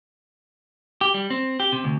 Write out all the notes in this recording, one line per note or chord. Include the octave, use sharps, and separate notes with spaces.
G4
G3
C4
G4
C3
D2